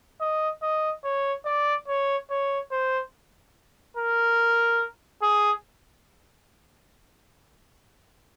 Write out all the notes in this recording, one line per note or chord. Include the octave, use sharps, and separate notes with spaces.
D#5
D#5
C#5
D5
C#5
C#5
C5
A#4
G#4